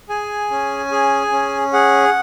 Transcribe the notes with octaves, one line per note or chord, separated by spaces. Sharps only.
G#4 G#5
C#4
G#4
C#4
G#4 F#5